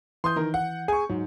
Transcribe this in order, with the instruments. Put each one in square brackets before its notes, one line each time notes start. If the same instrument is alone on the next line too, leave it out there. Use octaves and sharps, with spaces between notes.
[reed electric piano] E3 [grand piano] C6 D#6 G6
[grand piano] D#3 A#4
F#5
[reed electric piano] G#4 [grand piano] G#5 C#6
[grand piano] G#2 [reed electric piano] F#3